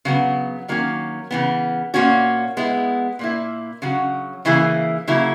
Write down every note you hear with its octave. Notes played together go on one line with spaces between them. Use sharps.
C#3 F#3 B3
D#3 F#3 A#3 C#4
C#3 E3 B3
A#2 A#3 C#4 F#4
G#3 B3 E4
A#2 A#3 E4
C#3 F#3 C#4 F#4
C#3 E3 A#3 E4 G#4
C#3 F#3 A#3 E4